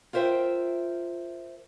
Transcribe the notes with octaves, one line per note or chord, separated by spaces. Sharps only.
F4 A#4 C5 E5 G5